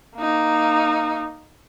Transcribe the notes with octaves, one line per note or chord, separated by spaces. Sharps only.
A#3 D#4